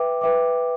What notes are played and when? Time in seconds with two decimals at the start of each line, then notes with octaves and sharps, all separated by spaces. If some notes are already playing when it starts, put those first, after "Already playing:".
Already playing: B4 E5 G5 D6
0.21 B4 E5 G5 D6